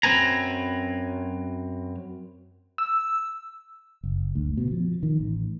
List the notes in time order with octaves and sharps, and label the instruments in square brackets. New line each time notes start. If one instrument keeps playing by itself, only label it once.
[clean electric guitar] F#2 C4 B4 G#5 A#5
[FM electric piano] E6
[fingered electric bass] F#1
D2
B2
F3
D#3
A1